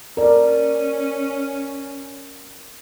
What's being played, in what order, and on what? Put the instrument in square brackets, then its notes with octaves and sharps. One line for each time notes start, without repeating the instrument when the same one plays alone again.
[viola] C#4 [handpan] A#4 D5